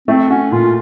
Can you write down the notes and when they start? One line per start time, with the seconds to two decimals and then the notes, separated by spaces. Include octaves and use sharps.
0.08 A3 C4
0.30 C#4 F#4
0.52 A#2 F4